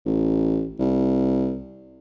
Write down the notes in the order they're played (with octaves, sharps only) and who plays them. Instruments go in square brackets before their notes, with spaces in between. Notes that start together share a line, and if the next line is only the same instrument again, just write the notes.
[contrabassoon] A1
C2